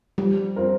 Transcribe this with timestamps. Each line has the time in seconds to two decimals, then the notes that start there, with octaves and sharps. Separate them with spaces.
0.18 F3 G3
0.56 C4 F4 A#4